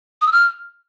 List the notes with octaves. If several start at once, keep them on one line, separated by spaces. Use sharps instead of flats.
D#6
E6
F6